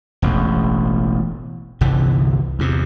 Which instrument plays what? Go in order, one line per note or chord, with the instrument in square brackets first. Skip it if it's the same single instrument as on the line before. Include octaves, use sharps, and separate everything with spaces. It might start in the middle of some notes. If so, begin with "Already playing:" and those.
[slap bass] E1 A1 E2
G1 C2 D3 E3
E2 C3